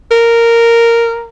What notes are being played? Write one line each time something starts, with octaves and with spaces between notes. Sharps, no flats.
A#4